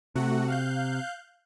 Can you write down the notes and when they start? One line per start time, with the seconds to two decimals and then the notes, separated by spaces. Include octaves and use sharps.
0.15 C3 A3 F#4 F#5
0.48 F5 F#6 G6